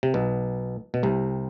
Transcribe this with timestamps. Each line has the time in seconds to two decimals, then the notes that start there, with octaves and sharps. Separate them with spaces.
0.03 C3
0.14 B1 B2
0.94 B2
1.03 C2 C3